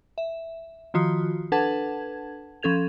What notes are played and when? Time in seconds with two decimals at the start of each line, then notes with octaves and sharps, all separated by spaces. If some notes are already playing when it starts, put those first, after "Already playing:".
0.18 E5
0.94 D#3 F3 F4 F#4 D#6
1.52 D4 A4 B4 F#5 A5 G#6
2.63 F3 C#4 A4 G#6 F7